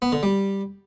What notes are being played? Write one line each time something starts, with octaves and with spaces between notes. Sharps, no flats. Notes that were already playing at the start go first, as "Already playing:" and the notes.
B3
D3
G3